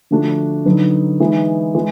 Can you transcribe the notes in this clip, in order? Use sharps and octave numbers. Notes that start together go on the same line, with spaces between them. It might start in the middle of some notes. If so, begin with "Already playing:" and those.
D3 F3 A3 D4 F#4
D3 F#3 B3 D#4
E3 G#3 B3 D#4
E3 G#3